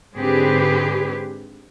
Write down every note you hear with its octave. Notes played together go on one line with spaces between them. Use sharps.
G#2 D3 C4 G4 G#4 B4